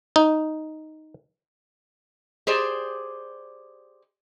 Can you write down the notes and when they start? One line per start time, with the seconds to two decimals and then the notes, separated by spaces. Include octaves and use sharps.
0.16 D#4
2.47 G4 G#4 C5 D5